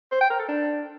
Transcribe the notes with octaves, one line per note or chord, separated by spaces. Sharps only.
C5
G5
A#4
A4
D4